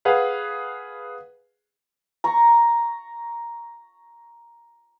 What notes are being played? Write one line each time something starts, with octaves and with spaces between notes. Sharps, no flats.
G#4 B4 F5 F#5
A#5 C#6